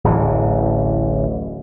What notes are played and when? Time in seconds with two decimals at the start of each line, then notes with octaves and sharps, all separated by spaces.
0.04 D1 A1 E3